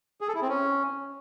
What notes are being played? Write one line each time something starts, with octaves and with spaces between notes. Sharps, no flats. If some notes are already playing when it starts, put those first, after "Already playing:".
G#4
A4
E4
C4
C#4